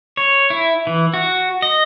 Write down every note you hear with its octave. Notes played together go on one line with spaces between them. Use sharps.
C#5
E4
E3
F#4
D#5